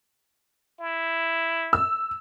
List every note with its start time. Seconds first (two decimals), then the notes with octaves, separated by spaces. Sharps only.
0.80 E4
1.73 E6